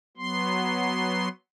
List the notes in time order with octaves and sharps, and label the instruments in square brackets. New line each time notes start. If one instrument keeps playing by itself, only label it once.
[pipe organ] F#3 B3 C6